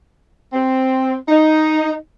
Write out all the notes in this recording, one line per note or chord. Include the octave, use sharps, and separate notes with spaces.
C4
D#4